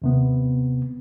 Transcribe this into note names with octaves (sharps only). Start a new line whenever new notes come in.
D#2 C3 B3